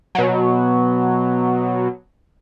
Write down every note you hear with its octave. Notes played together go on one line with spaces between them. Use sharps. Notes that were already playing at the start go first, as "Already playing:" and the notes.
B2 F#3